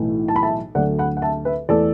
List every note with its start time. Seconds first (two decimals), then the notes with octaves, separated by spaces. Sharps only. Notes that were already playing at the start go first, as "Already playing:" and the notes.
Already playing: B1 A2 E3 A3
0.28 A5
0.36 B5
0.43 E5 A5
0.75 D2 D3 F#3 A3 D5 F#5
0.98 F#5 B5
1.17 F#5
1.22 E5 A5
1.45 B4 E5
1.69 E2 E3 A3 A4 D5